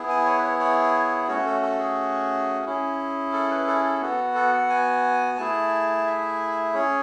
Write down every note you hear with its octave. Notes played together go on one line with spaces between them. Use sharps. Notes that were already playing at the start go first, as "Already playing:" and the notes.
Already playing: B3 E4 G#4
G#5
C#5
B4
C#5
C#5
A3 C#4 F#4 C#5
A4
A4
G#4
C#4 E4 G#4
A4
B4
A4
A4
B3 F#4 A4
A4
F#5
G#5
A3 E4 G#4 A5
E5
C#4 G#4 C#5